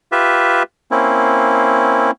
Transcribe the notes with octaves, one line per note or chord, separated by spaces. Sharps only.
F4 G4 B4 E5
A#3 C4 C#4 E4